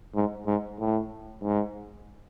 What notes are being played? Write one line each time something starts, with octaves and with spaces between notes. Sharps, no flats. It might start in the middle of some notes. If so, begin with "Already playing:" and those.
G#2
G#2
A2
G#2